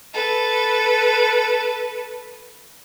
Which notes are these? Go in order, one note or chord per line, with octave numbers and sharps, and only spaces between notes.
A4 B4